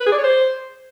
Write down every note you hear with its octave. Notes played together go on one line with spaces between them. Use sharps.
B4
G#4
D5
C#5
C5